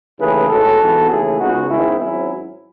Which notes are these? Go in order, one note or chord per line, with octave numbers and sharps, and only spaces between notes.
D#2 C#3 E3 A3 G#4 B4
B1 A2 G#3 F#4 A4
G#2 E3 B3
D#2 C#3 E3 A3 E4 G#4
C#2 C#3 G#3 B3 D#4 F#4
G#2 D#3 G#3 B3 C#4 E4
G#1 G#2 F#3 C#4 E4